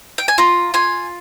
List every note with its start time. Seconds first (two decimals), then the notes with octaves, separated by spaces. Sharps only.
0.18 G5
0.28 G#5
0.38 F4 A#5
0.74 F4 G#5